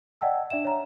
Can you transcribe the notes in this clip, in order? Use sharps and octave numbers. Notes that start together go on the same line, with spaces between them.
D5 D#5 F#5 G5 A5 E6
D4 D5 E5 E7
C#5 A#5